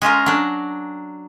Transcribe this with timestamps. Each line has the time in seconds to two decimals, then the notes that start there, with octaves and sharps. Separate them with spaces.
0.02 G#3 C#4 F4 A#4
0.26 F#3 D4